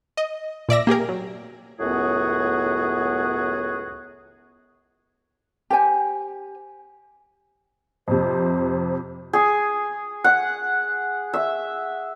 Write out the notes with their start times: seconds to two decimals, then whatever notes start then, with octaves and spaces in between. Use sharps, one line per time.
0.17 D#5
0.69 A#2 D5 E5 A#6
0.87 A#3 G4 G#4 A#4
1.09 F#3
1.79 C#2 F#2 A2 B3 F#4 G#4
5.70 G4 C5 G#5
8.08 F2 C3 C5
9.33 G#4
10.24 F#5
11.34 E5